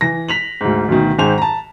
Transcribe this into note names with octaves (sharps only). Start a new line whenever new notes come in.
E3 A#6
B6 F7 F#7
D2 G#2
D2 B2 D#3
G#2 D#3 C5 G#5 F7
A5 A#5